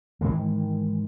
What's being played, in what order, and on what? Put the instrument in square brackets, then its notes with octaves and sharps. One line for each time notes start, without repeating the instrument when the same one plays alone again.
[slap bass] G#2 D#3 E3 G#3